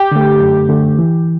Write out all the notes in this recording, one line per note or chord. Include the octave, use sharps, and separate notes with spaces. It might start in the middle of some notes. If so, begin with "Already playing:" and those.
Already playing: G4
D3 A3
F#2
D3 A3
E3